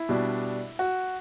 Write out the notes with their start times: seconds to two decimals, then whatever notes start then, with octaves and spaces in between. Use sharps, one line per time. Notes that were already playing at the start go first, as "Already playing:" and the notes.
Already playing: E4
0.09 B2 G3 D4
0.79 F#4